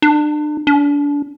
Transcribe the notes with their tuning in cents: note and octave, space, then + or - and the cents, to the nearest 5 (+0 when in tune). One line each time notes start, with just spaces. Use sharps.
D4 +35
D4 -30